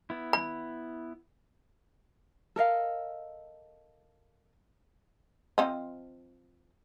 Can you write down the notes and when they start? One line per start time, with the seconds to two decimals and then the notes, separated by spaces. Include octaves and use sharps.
0.10 B3 E4
0.33 B5
2.56 A4 A#4 D#5 F5
5.58 F3 C4 D#5